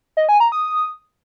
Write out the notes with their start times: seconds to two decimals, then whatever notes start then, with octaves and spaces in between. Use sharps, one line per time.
0.17 D#5
0.29 G#5
0.40 A#5
0.52 D#6